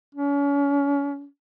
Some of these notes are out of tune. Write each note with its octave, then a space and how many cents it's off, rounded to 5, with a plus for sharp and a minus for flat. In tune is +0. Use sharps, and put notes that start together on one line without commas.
C#4 +35